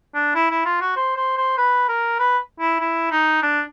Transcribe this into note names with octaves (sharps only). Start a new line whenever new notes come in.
D4
E4
E4
F4
F#4
C5
C5
C5
B4
A#4
B4
E4
E4
D#4
D4